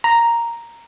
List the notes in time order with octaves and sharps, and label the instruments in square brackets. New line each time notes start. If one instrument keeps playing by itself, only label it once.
[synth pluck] A#5